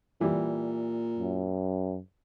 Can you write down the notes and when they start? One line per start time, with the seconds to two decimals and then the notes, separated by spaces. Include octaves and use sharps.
0.21 A#2 E3 G3
1.18 F#2